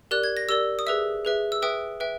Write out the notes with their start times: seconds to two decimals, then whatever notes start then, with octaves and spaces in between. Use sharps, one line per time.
0.11 G4 A#4 D5 F#6
0.24 G#6
0.37 A#6
0.49 G4 A#4 D5 E6
0.79 D#6
0.87 G#4 B4 E5 E6
1.25 G#4 B4 E5
1.52 E6
1.62 B4 E5 G5 D#6
2.00 B4 E5 G5